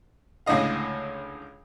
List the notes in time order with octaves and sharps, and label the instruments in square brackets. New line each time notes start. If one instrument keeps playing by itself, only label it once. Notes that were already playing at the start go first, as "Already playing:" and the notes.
[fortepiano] C#2 A2 D3 D#5 F5